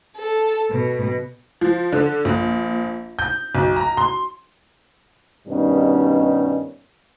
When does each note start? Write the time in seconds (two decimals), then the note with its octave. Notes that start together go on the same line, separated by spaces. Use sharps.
0.15 A4
0.71 B2
1.61 F3
1.93 D3
2.25 A#1
3.19 G6
3.55 B1
3.76 A#5
3.97 C6
5.47 G2 B2 D#3 G3 C#4 D#4